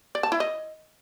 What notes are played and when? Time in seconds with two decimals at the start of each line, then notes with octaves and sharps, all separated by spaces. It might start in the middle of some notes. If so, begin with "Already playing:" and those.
0.15 D5
0.23 A5
0.32 E4
0.40 D#5